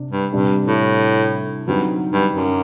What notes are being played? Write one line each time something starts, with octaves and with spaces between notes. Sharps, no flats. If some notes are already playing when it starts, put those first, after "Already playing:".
Already playing: C3 D4
G2
G2 C3 G3 D4
A2
G2 D3 F#3 C4 D#4 F#4
G2
F#2